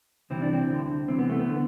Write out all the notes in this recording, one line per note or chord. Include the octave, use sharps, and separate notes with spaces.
C2 C3 E3 C4
D4
C4
D2 D3
C2 C3 E3 C4
B3
A3
B3
D3